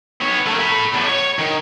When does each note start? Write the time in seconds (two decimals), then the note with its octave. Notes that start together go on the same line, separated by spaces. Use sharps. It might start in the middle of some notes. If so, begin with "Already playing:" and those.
0.21 B3 C#5
0.46 A3 A#4
0.60 A4 B5
0.93 E2 A2
1.06 C#5
1.39 D#3